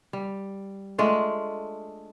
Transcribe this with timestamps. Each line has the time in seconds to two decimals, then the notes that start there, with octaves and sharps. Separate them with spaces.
0.13 G3
0.98 G#3 A3 D4 F4